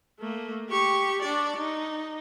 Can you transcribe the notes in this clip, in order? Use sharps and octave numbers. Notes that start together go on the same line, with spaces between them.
A3 A#3
G4 C#6
D4 D5
D#4